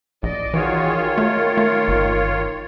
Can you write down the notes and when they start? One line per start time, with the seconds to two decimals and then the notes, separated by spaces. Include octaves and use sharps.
0.23 A#1 D5 D#5
0.54 D#3 E3 F4 F#4 G#4 C#5
1.18 A3 A#4
1.57 A3
1.88 G1